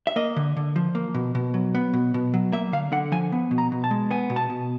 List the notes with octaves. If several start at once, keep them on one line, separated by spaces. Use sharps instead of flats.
E5
A#3 D#5
D3
D3
F3
A#3
B2
B2
F#3
B3
B2
B2
F#3
A#3 E5
D3 F5
D3 F#5
F3 G#5
B3
B2
A#5
B2
A5
G#3
B3 G#5
B2
A5
B2